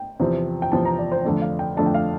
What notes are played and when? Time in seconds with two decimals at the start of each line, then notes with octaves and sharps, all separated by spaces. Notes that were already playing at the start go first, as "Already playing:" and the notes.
Already playing: G5
0.19 E2 C3 F3 C4
0.62 G5
0.72 E2 C3 F3 C4 A5
0.85 A#5
0.99 D5
1.12 C5
1.25 F2 D3 A3 D4
1.42 F5
1.59 G5
1.77 F2 D3 A3 D4 A5
1.86 G5
1.94 F5